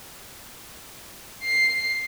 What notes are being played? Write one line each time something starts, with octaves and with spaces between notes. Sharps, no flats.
C7